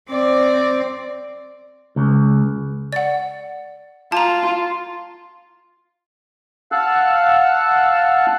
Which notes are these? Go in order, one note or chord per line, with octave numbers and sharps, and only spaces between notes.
C4 D5
C#2
D5 F#5
F4 A5 A#5
F5 F#5 A5 E6 F#6